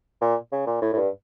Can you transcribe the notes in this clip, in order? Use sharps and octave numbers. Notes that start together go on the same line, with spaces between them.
A#2
C#3
A#2
A2
A2
G2